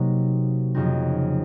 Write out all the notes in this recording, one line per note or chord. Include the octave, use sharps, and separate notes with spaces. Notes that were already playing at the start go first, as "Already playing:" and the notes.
Already playing: C3 F#3 A#3 D#4
F2 C#3 F#3 C4 D#4